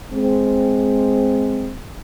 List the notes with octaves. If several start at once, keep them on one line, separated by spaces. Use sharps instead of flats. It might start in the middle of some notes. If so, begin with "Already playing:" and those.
G#3 C4